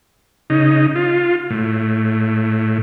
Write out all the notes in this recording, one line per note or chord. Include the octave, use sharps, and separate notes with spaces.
C#3 D#4
F4
A2